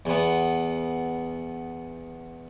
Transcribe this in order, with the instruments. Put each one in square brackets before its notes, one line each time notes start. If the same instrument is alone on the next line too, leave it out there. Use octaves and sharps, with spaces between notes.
[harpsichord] E2 B3